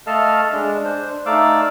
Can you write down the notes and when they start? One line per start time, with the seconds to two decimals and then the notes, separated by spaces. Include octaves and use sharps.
0.07 A3 A4 D#5 F5 A5 F6
0.53 G#3 D4
0.85 D4 C5
1.26 A3 D#4 D5 F5 D6 E6